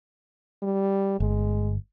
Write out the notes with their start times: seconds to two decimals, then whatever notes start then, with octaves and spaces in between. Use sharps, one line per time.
0.63 G3
1.20 G1 G#3